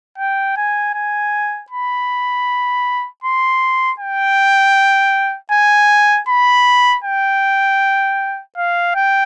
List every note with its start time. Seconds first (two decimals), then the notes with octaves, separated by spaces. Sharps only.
0.18 G5
0.56 G#5
0.94 G#5
1.70 B5
3.24 C6
4.00 G5
5.52 G#5
6.29 B5
7.04 G5
8.57 F5
8.95 G5